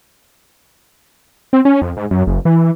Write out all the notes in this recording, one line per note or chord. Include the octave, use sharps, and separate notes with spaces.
C4
C#4
F2
G#2
F#2
F#1
E3